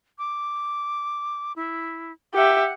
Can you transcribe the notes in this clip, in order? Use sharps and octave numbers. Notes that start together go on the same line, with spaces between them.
D6
E4
G4 E5 F#5